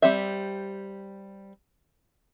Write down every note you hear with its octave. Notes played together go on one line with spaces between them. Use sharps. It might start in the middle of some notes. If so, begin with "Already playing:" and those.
G3 C4 G4 E5